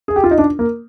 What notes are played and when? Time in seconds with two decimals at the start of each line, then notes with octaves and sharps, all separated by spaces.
0.08 G#4
0.16 G4
0.24 F4
0.31 D#4
0.38 D4
0.59 A#3